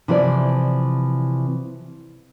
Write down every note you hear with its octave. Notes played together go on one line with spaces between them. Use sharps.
C3 E3 F3 E4 D5